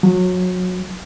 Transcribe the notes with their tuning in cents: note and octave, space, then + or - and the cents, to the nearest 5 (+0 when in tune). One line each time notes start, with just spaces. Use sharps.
F#3 -25